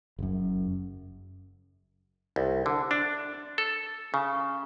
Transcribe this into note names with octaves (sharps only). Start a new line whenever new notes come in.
F#1 F#2
C2
D3
D4
A4
C#3